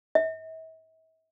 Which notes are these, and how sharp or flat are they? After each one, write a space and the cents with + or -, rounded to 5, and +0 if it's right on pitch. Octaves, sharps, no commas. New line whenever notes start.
E5 -45